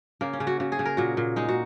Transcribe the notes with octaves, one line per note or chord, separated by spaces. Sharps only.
C#3 A#3
C#4
C#3
F#4
C#3 F#4
G#4
C#3
A#4
A#2 F#4
A#2
G#3 D#4
F#4